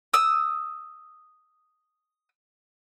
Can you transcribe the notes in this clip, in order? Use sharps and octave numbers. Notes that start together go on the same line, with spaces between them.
D#6 E6